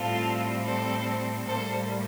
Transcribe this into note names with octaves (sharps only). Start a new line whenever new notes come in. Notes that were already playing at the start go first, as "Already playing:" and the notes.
Already playing: A2 G3 C4 F4 A4
A4 C5
A2 G3 A#3 A4 C5